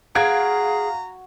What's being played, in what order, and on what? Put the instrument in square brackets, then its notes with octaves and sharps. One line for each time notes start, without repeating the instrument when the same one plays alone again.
[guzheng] F#4 [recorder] G#4 [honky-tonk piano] F5 G#6 D7 [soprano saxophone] A#5